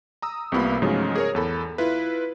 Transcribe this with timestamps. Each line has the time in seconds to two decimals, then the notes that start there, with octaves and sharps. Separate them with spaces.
0.22 A#5 D#6 E6
0.52 C2 C3 A#3 B3 F4 B5
0.82 G#2 C#3 F3 F#3 G#3 A3
1.15 G#4 A#4 C#5
1.35 E2 A4 B5
1.78 E4 F4 B4